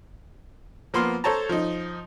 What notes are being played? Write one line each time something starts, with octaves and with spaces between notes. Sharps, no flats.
F3 A#3 B3 C6 F6
A4 C5 C#5 A5 A#5
F3 D#4